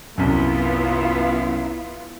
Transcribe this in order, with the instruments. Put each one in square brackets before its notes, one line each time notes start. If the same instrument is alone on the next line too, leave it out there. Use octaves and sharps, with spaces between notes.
[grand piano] C2 F#2 [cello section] B3 E4 F4